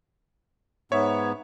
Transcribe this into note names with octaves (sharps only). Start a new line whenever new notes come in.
G#2 B3 C#5 E5